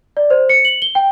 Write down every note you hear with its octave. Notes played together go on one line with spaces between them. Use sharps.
D5
C5
C#7
F#7
G7
G5